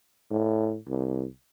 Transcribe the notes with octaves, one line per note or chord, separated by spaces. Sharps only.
A2
C2